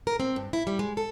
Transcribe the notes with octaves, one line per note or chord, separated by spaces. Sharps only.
A#4
C4
G2
E4
G3
G#3
A4